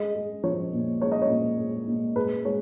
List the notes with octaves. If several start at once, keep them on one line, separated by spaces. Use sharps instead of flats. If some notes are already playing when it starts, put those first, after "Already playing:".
Already playing: G#3 D#5
G#3
F3 C#5
A#2
G#3 C#5
D#5
C#5
A#2
G#3
A#2
G#3 B4
G#3 C#5